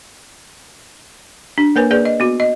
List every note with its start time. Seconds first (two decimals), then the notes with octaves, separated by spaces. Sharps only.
1.58 D4
1.76 A#3 A#4 B4 C#5 G#5
1.90 A#3 G#4 B4 D5
2.05 D#5
2.20 B3 F#4
2.40 D#5